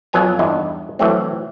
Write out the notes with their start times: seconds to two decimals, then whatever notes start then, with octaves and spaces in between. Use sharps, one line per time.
0.13 F2 F#3 B3 G#5 A#5
0.39 E2 G2 D#4 E4
0.99 E3 F#3 A3 C4